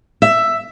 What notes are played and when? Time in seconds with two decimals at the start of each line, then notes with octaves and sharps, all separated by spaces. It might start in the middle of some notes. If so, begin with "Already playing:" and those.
0.22 E5